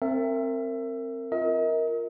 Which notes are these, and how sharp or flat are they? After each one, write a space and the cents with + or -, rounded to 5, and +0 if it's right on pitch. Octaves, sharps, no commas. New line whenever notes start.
C4 +10 A#4 -25 E5 +20
F4 +0 A#4 +0 D#5 +40